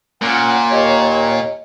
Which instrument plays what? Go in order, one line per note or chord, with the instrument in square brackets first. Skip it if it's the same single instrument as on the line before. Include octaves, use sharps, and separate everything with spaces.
[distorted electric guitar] A#2 [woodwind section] C#4 F#5
[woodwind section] D#2 C#5 [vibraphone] D#5